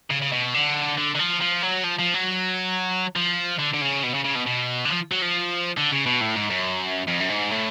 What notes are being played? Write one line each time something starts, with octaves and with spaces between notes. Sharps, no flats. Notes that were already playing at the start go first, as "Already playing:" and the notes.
C#3
C#3
B2
D3
D3
D3
F3
F3
F#3
F3
F3
F#3
F3
D3
D3
C#3
B2
C#3
C#3
B2
B2
D3
F3
F#3
F3
D3
C#3
B2
A2
G#2
F#2
F2
F#2
G#2
A2